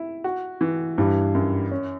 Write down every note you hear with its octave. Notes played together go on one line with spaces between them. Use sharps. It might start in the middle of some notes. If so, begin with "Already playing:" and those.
Already playing: E4
F#4
E3
G2 E3
F#2
C#4